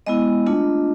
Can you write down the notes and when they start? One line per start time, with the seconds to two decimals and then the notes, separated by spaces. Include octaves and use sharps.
0.06 G#3 B3 E4 D#5
0.46 A3 D4 F4